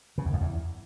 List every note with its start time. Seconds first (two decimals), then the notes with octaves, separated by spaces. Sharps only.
0.18 C#3
0.25 E2
0.33 F2
0.41 E2